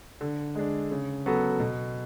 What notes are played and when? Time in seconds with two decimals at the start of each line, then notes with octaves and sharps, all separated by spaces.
0.21 D3
0.55 G#3 D4
0.91 C#3
1.26 F#3 B3 F#4 A4
1.59 B2